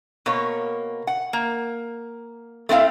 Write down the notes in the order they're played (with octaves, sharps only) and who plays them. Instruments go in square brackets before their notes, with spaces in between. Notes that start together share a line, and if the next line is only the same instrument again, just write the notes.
[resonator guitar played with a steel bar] B2 A#3 C#5
F#5
A#3
A3 C4 E4 F5